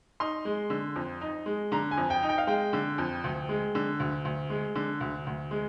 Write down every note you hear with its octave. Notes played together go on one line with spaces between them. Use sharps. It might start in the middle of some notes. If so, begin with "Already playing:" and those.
D#4 C6
G#3
D3
F2
D#4
G#3
D3 A#5
G#5
F2
G5
D#4
G5
F5
G#3 G5
D3
F2
D2
G#3
D3
D2
D2
G#3
D3
D2
D2
G#3